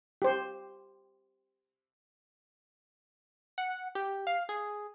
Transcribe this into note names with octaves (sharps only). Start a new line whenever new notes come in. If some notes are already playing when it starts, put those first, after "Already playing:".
G4 C5
F#5
G4
F5
G#4